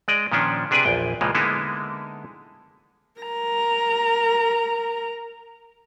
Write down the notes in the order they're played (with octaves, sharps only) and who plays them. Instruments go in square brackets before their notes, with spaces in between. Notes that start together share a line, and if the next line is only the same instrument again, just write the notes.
[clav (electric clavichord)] G#3 D5 D#5
A#2 D#3 F3 C#4 D4
C3 D4 G#4 B4 D5 G#5
A#1 E2 G5
C#2 A#2 E3 F3 G#3
D3 G#3 A#3 B3 D#4 E4
[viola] A#4 A#5